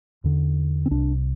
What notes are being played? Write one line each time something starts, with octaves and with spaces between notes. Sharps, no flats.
E2 D3
C4
C2 C3 D4